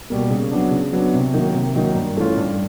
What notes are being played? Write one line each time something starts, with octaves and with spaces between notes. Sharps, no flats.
B2 G3 A#3
C#3
F#3 B3 D4
C#3
F#3 B3 D4
C3
D#3 F#3 A#3 D#4
C3
D#3 F#3 A#3 D#4
G2
E3 A3 C#4 F4
G2